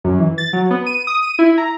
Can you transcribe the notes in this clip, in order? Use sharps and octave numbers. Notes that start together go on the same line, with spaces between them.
F#2
E3
A6
F#3
B3
D#7
D#6
D#7
E4
A#5